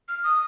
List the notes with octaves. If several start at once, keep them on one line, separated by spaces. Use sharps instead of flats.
F6
D#6